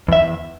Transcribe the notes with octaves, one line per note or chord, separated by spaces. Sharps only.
E2 E5
E2